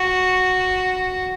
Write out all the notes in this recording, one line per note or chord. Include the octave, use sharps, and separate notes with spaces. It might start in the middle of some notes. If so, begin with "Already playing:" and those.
Already playing: F#4